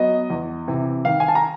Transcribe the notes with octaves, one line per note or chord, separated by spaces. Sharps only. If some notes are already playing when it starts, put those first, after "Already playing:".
Already playing: F#3 B3 D#5
E2
C3 E3
D#3 F5
G#5
A5
A#5